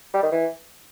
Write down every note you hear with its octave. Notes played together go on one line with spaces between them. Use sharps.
G3
D#3
E3